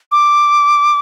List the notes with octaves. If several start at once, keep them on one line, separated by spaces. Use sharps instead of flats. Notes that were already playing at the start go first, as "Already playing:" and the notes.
D6